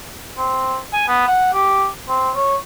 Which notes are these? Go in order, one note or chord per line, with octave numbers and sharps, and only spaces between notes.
C4
G#5
B3
F#5
G4
C4
C#5